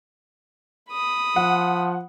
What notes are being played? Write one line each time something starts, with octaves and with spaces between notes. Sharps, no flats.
B5 D#6
F3 F#5